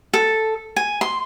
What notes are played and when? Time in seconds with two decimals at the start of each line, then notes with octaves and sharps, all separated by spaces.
0.14 A4
0.76 G#5
1.01 C6